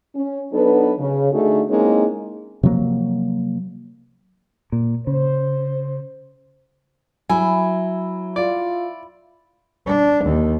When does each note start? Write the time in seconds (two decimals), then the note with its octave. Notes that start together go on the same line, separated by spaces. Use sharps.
0.15 C#4
0.53 F#3 B3 D4 D#4 A4 B4
0.99 C#3
1.32 D3 A3 D#4 F#4 G#4 A4
1.69 G#3 A#3 C4 C#4 D#4 E4
2.63 C3 F3 F#3 A#3
4.72 A#2
5.07 C#3 C5
7.29 F#3 E4 G#5
8.36 F4 D5
9.86 D4
10.24 D#2